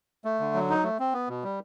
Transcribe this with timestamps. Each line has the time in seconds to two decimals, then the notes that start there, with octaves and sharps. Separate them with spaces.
0.25 A3
0.40 D3
0.54 F#3
0.70 D#4
0.83 A3
0.99 C4
1.13 B3
1.29 B2
1.44 G3